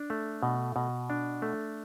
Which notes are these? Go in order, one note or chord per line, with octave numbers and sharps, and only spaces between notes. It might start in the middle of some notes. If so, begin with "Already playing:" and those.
Already playing: D4
A3
B2
B2
D4
A3